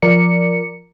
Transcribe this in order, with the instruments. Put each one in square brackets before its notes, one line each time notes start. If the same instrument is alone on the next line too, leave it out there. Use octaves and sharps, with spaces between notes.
[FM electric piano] F3 A#4 D5 C#7